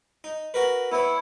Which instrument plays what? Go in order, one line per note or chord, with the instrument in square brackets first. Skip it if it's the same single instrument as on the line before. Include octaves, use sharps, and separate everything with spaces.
[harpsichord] D#4
F#4 A#4 B4
[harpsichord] B3 C#5 [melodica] E4